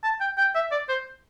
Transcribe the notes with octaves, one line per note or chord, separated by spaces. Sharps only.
A5
G5
G5
E5
D5
C5